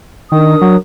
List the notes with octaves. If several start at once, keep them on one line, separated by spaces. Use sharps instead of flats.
D#3 D4 A#4 D#6
F#3